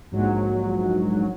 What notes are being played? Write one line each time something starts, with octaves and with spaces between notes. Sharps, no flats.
A#1 G#2 F#3